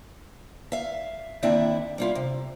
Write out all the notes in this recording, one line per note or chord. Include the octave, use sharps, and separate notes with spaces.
E5 F5
D#2 D3 C4 D4 E4 E5
G3 E4 F4
C3